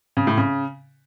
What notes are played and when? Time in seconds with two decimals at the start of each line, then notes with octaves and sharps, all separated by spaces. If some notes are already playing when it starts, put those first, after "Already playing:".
0.17 C#3
0.27 A2
0.37 C#3